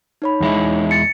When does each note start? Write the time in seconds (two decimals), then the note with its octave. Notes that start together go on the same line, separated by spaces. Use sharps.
0.22 D#4 C#5 B5
0.40 E2 G#3 E4
0.91 A6 C#7